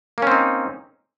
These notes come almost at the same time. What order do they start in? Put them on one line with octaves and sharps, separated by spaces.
A#3 C#4 C4 D#4